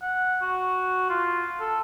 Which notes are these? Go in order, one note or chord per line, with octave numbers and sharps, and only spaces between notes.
F#5
F#4
F4
A4